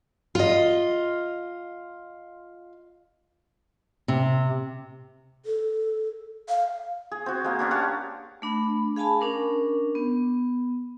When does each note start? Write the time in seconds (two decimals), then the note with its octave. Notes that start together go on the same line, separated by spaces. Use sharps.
0.35 F4 D#5
4.08 C3
5.46 A4
6.49 F5
7.11 G#4
7.26 C4 F#4
7.44 G#3 A#3
7.59 C#4 D4 F#4
7.71 G4 C#5 F#5 A5
8.42 A3 D4 B5
8.96 G#4 F5 G#5 A5 B5
9.21 C#4 D4 A#4
9.95 B3